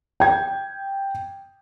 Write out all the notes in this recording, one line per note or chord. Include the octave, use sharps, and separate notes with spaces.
G5 G#6